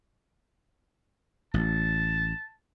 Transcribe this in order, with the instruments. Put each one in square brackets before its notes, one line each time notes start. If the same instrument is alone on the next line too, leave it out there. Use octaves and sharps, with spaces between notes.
[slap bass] A1 [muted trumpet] A5